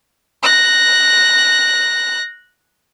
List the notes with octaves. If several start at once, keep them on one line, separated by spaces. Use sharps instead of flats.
F#6 A#6